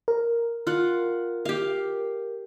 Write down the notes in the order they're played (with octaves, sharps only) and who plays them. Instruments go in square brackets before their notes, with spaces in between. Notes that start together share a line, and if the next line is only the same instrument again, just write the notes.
[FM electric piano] A#4
[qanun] F4 F#5
G4 F5